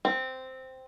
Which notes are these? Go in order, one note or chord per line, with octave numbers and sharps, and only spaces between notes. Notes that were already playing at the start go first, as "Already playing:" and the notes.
C4